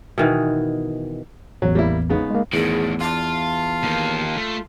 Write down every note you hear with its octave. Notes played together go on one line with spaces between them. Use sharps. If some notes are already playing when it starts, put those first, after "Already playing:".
B2 D#3 E3
A1 E2 F#3
G3 A#3 E4
G#2 C#3 B3
G#3 A#3
E2 A2 D#3 G#4
F4 A5
D#3 A#3
A3